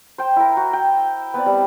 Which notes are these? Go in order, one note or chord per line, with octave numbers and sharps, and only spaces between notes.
C5 G5
E4 A#4
F#4
G5
B3 C4 D5
G3